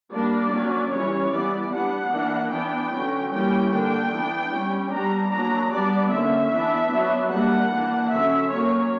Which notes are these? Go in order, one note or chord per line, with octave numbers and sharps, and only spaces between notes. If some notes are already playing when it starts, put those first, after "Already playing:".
G3 A#3 D4 D5
F#3 A#3 C#4
E3 G3 C#4 C#5
E3 G3 B3 D5
G3 B3 D4 F#5
E3 A#3 D4
E3 B3 D4 G5
D3 F#3 C#4
E3 G3 A#3 C#4 G5
D3 A#3 D4 G5
E3 B3 D4
G3 C#4
G3 B3 D4 A#5
F#3 A#3 D4 A#5
G3 B3 D4 D5
D3 A#3 C#4 E5
E3 B3 D4
F#3 B3 D4
G3 A#3 D4 F#5
E3 A#3 D4
D3 F#3 C#4 E5
F#3 A#3 C#4 C#5